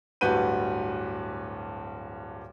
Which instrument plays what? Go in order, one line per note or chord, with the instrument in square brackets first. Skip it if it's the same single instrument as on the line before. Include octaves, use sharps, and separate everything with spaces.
[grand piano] D1 G2 F#4 B4 G6 D#7